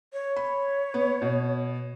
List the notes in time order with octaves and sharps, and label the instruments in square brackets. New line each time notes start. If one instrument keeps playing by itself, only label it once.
[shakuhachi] C#5
[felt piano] B5
B3
B2